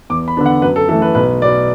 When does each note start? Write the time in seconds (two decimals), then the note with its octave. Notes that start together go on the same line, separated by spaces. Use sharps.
0.10 E2 D6
0.28 B5
0.37 D3 B3 D4
0.46 F#5
0.62 F#2 B4
0.76 A4
0.89 E3 A3 A4
1.02 B4
1.15 B1 B4
1.42 B2 B3 D5